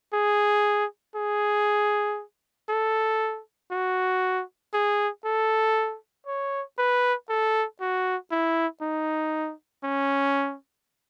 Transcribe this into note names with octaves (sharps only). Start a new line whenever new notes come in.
G#4
G#4
A4
F#4
G#4
A4
C#5
B4
A4
F#4
E4
D#4
C#4